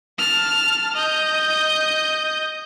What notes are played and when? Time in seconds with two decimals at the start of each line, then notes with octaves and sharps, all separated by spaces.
0.18 A5 F6
0.94 D#5 G6